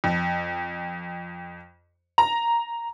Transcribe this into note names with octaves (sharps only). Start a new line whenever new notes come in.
F2
A#5